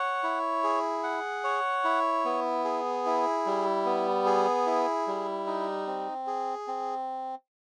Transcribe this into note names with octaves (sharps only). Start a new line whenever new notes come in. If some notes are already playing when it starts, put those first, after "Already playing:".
Already playing: C#5 F#5
E4
G#4
F#5
C#5
E4
B3
G#4
E4
G3
B3
G#4
E4
G3
D#4
C4
G#4
C4